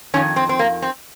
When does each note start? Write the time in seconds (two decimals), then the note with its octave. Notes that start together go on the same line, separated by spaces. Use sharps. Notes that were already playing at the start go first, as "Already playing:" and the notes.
0.14 F2 D#3 C#4
0.36 C4
0.49 C4
0.59 A#3
0.82 C4